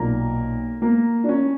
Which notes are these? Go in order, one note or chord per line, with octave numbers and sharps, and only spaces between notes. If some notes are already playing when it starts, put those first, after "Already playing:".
Already playing: B1 A#2 A#3 A#4
A#3 A#4
D4
C#4